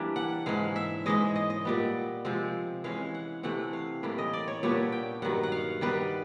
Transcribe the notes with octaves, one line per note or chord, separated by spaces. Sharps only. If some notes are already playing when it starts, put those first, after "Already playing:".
Already playing: E3 G3 A#3 D4
F#5
G#2 E3 G#3 F5
E5
G#2 E3 G#3 D#5
D#5
D#5
A#2 G3 B3
C3 F3 G#3 C4
E3 G#3 C#4 F5
F#5
C3 E3 A3 C4 F#5
F5
A2 E3 G3 A#3
D#5
D5
C#5
A#2 G3 B3 D4 C#5
G5
G2 D#3 F#3 F#5
F#5
F5
D#3 G3 B3 B4